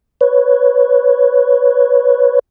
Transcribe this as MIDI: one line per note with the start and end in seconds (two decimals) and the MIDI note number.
0.21 2.39 71
0.21 2.39 73